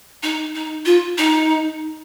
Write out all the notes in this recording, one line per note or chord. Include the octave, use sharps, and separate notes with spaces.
D#4
D#4
F4
D#4